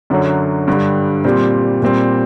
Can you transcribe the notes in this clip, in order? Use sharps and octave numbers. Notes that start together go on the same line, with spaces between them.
F#2 D3 F#3
G2 D3 G3
A#2 G3 C4
A#2 G3 C4